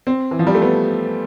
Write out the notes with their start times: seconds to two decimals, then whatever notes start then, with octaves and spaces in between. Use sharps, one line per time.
0.07 C4
0.31 E3
0.39 F3
0.47 G3
0.55 A3
0.62 B3